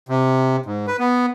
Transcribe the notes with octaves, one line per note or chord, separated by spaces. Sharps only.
C3
G#2
B4
B3